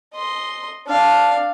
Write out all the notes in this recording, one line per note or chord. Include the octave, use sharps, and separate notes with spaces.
D#5 C6
D4 F5